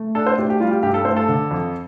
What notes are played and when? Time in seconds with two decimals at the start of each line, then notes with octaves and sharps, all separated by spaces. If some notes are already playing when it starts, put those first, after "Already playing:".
Already playing: A3
0.15 D4 A4
0.27 C5
0.38 A3 G4
0.50 G4
0.60 G3 F4
0.71 G4
0.82 G2 G4
0.94 A4
1.05 A3 C5
1.17 A4
1.29 D3
1.51 F2